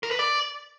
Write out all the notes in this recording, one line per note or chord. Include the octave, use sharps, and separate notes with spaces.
A#4
B4
D5